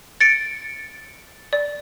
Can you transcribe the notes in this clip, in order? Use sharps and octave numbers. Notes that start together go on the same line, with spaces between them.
A6 C#7 D7
D5